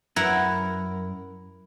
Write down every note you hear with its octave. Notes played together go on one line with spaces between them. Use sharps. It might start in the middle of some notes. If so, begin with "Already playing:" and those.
F#2 E4 A#4 F#5